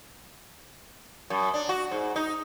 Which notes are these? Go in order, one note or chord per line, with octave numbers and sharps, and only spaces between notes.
F#2
D4
F#4
G#2
D#4